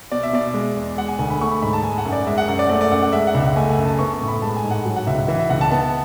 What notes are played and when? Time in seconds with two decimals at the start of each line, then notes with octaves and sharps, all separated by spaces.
0.12 B2 D5
0.23 E5
0.33 B2 D5
0.54 G#3
0.76 E2
0.97 G#3 F#5
1.08 G#5
1.19 D2 G#5
1.30 B5
1.41 A3 C#6
1.52 B5
1.62 G#2 B5
1.73 A5
1.83 G#3 G#5
1.98 F#5
2.05 F#2
2.12 D5
2.27 G#3 E5
2.38 F#5
2.48 F#2 F#5
2.59 D5
2.69 A3 D5
2.81 D5
2.91 F#2 F#5
3.02 F#5
3.13 G#3 E5
3.27 F#5
3.34 C#2
3.42 E5
3.56 A3 G#5
3.70 G#5
3.78 F#2
3.85 A5
3.99 B3 C#6
4.14 C#6
4.21 A2
4.28 B5
4.42 G#3 A5
4.57 G#5
4.64 G#2
4.71 F#5
4.86 F#3
4.96 F#5
5.07 C#2 E5
5.28 E3 E5
5.39 E5
5.50 C#2 F#5
5.61 A5
5.71 B3 A5